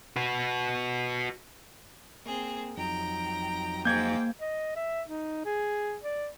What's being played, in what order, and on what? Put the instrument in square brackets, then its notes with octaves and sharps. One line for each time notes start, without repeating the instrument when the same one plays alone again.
[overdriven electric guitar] F#4 B4
[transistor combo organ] A#3 [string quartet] C4 G#4
[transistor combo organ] F2 F#3 D#4 [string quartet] G5 A#5
[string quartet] G#2 G5 [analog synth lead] A#3 [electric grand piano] G6 G#6
[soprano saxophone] D#5
E5
D#4
G#4
D5